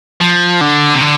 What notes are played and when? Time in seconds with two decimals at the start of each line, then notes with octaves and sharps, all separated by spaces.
0.20 F3
0.61 D3
0.94 C3
1.01 D3